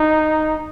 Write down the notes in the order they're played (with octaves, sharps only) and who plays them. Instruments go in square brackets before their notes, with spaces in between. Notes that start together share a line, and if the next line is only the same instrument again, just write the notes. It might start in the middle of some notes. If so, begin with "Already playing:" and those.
Already playing: [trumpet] D#4